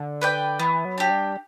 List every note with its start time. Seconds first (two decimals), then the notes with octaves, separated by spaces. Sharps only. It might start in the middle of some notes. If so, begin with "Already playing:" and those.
Already playing: D3
0.21 B4 D5 G5
0.59 E3 B3
0.85 F#3
0.98 D4 G4
1.10 G3